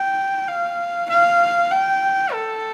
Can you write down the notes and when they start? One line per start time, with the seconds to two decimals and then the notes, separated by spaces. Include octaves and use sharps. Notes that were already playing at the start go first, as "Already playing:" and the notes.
Already playing: G5
0.48 F5
1.09 F5
1.71 G5
2.32 A4